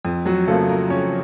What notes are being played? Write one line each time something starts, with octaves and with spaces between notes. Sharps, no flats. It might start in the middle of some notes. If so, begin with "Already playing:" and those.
F2
F#3 F#4
C#3 F3 A3 A#3 A4
A#3 A#4
F2 C#4 C#5